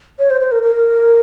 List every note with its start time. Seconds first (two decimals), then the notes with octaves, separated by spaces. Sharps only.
0.19 C#5
0.30 C5
0.41 C5
0.51 A#4
0.63 A#4